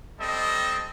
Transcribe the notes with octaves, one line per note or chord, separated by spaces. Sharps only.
G3 C4 A4 D#5